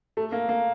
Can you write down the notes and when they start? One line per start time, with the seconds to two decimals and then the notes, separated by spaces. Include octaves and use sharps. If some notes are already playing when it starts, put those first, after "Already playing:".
0.17 A3
0.32 A#3
0.49 A#3